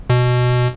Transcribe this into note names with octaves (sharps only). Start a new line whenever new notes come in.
B2